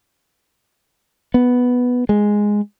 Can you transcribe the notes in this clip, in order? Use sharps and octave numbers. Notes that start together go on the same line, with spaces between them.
B3
G#3